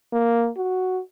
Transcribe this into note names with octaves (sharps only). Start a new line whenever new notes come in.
A#3
F#4